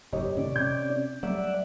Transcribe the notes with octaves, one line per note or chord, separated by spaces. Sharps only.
F#1 G#2 G4 C#5 D#5
C3 D#3 A3 C#4 D5
C3 G6
F#3 G3 A3 D5 E5 F#5